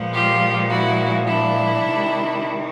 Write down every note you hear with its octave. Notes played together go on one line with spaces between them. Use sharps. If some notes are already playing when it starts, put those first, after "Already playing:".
Already playing: A#2 F3 G#3 B3
F4 G4
E4 F#4
D4 E4
C3 D#3 G#3